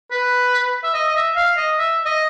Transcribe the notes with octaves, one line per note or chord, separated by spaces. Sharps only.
B4
E5
D#5
D#5
E5
F5
D#5
E5
D#5